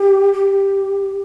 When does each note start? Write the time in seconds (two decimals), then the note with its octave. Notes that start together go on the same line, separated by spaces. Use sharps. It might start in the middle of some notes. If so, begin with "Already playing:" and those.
Already playing: G4
0.33 G4